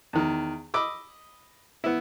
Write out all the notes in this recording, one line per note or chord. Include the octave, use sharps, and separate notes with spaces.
E2 D#3
D#5 B5 D6 E6
B3 E4